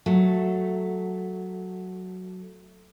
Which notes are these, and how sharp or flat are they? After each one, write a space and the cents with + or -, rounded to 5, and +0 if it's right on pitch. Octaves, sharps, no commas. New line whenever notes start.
F#3 +0 A3 +0